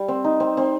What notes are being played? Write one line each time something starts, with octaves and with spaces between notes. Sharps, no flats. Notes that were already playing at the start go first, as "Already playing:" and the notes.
Already playing: G3
C4
D#4
C4
C4